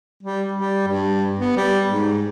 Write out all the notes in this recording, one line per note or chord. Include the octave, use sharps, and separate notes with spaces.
G3
G3
G2
B3
G3
G#2